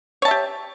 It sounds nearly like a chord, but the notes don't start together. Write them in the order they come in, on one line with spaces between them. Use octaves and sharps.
C#5 A5 E5 G4